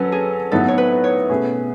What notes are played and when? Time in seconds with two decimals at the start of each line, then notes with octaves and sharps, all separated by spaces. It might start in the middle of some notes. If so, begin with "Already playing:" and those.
Already playing: F#3 C#4 A4 B4
0.12 G#4
0.52 A2 F#3 B3 D#4 A4
0.68 C#5
0.78 B4
1.04 C#5
1.29 B2 A3 C#4 G#4